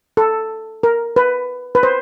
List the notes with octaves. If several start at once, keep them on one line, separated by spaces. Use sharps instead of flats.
A4
A#4
B4
B4
C5